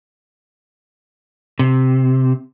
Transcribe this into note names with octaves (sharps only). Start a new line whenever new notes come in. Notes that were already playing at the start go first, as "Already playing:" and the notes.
C3